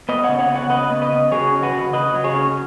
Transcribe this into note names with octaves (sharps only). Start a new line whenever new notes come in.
B3 B4 D#5
C#3 C#5 F#5
C#5 F#5
B3
C#5 F#5
C#3 B4 D#5
B3
B4 D#5
C#3
F#3 G#4 C#5
C#4
F#4 B4
C#3
C#3 B4 D#5
F#3
G#4 C#5
C#4